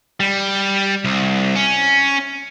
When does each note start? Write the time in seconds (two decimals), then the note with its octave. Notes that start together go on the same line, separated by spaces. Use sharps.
0.20 G3
1.04 C2
1.56 C#4